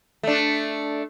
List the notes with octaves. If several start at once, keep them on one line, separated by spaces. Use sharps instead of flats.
A3 D4